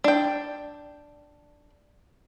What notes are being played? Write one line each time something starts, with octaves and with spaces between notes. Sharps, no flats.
D4 G5